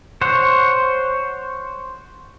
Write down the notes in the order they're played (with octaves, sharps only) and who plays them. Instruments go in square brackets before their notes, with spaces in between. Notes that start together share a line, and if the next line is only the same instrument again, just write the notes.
[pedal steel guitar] C5 C#5 F#5